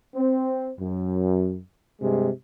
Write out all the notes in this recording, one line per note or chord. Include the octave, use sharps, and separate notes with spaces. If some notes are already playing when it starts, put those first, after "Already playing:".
C4
F#2
G2 C3 G#3